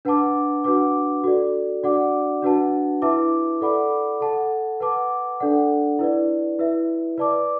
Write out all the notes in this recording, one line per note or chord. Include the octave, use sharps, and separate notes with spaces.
D4 B4 F#5 A5 D6
D4 F#4 B4 F#5 D6
F#4 A4 D5
D4 F#4 D5 F#5 D6
D4 F#4 B4 F#5 A5
E4 B4 E5 A5 D6
A4 D5 F#5 B5 D6
A4 F#5 A5
B4 F#5 A5 D6
D4 A4 D5 F#5
E4 B4 D5
E4 B4 E5
B4 D5 A5 D6